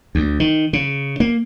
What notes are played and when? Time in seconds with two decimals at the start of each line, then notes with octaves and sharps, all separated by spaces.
0.15 D2
0.40 D#3
0.73 C#3
1.20 A#3